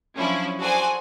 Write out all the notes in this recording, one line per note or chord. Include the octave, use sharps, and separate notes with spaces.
F3 F#3 C#4 D4 E4
F#4 G#4 A4 C5 D5 G#5